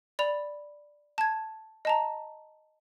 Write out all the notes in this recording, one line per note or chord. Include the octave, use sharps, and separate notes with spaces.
D5 B5 F7
A5 G#6
D#5 A5 A#5